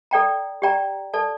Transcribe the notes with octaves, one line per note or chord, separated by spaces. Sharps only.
A4 D5 G5 A#5
G4 D5 G5 A#5
A4 D5 A5